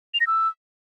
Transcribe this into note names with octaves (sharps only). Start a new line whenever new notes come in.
F7
A#6
E6